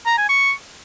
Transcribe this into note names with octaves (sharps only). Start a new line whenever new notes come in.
A#5
G#5
C#6